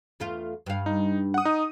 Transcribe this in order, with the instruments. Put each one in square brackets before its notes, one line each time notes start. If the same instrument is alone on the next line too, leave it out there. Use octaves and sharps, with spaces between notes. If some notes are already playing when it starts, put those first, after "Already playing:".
[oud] E2 A3 F4
G2 F5
[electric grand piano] D#4
F#5 D#6
D#4